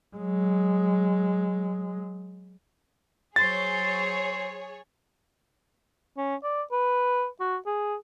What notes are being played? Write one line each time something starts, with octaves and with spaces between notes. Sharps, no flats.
F#3 G#3
F#3 G#4 C5 C#5 A6
C#4
D5
B4
F#4
G#4